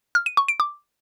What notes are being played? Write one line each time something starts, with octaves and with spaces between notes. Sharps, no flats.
F6
D#7
C#6
D7
D6